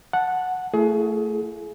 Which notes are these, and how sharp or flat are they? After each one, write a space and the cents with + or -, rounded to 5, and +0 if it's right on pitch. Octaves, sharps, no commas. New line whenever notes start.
F#5 -10 A5 +0
A3 +20 E4 +40 G#4 +30